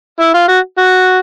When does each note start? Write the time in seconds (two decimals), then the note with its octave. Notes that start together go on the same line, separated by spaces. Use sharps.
0.20 E4
0.34 F4
0.48 F#4
0.78 F#4